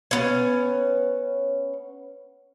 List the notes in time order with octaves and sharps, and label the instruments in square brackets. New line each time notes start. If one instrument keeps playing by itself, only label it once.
[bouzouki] B3 C#4